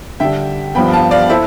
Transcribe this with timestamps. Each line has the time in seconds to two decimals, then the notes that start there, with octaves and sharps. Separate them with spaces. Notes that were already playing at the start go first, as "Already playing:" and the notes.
0.20 D3 G3 D4 E5 G5
0.75 G2 F3 B3 G5 B5
0.93 F5 A5
1.11 D5 F5
1.29 E4 A4 C5 E5